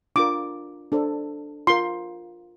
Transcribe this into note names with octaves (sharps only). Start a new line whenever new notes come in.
D4 F4 A#4 D6
D4 A4 C5
F4 A#4 C6